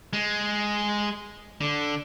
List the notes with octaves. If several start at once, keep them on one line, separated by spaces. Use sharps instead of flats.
G#3
D3